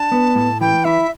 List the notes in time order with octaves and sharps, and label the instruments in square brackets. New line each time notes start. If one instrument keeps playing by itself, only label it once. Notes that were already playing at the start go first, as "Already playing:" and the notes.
Already playing: [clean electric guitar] D4 [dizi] A5
[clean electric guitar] B3
A2
[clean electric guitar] E3 [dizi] G5
[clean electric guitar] E4 [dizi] E5